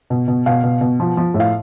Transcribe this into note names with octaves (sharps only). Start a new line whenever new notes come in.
B2
B2
B2 F5
B2
B2
F3
F3
A2
F5